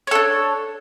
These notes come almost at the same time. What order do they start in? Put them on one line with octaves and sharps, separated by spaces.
C#5 A4 D4